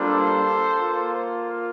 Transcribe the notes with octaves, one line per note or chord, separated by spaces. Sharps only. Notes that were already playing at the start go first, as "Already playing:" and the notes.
Already playing: G3 A#3 D4 F4 A4 C5
A#3 F4